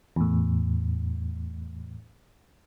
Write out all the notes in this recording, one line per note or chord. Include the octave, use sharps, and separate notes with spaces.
E2 A2